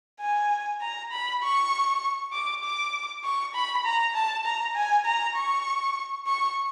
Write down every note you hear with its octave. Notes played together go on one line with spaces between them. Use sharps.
G#5
A#5
B5
C#6
D6
D6
C#6
B5
A#5
A5
A#5
G#5
A#5
C#6
C#6